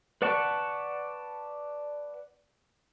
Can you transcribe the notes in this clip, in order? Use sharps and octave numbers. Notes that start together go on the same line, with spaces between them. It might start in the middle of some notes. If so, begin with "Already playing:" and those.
B4 D5 F#5 A5 C#6